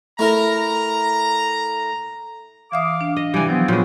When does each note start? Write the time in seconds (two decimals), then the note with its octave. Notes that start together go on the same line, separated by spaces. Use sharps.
0.19 A3 E4 A#4 A#5
2.72 E3 E5 F5 D6 D#6
3.01 D4
3.16 D#5
3.34 C3 E3 G3 G#5 D6
3.49 F3 F#3 B3 C4
3.68 A#2 E3 G#3 B3 F#4 C5 C#5